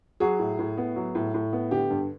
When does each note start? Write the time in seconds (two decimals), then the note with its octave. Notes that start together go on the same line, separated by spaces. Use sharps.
0.20 F#3 F#4 G#4
0.39 A2
0.59 A2
0.77 B3
0.96 F#3
1.15 A2
1.34 A2
1.53 B3
1.71 D3 G4
1.90 G2